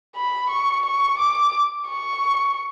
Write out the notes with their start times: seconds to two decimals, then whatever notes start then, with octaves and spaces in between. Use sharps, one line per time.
0.16 B5
0.50 C#6
0.85 C#6
1.19 D6
1.88 C#6